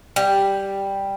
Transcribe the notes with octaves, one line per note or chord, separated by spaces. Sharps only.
G3